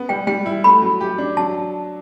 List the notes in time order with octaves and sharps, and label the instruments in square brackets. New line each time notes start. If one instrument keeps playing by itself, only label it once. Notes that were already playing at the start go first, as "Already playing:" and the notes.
Already playing: [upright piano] B3
[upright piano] G3 [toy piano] G5
[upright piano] G3 [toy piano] G5
[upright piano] E4
[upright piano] A3 [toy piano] B5
[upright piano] F#3
G4
D4
[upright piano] F#3 [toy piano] A5